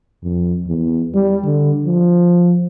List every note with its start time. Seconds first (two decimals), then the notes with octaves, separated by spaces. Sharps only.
0.23 F2
0.67 E2
1.14 G3
1.45 D3
1.86 F3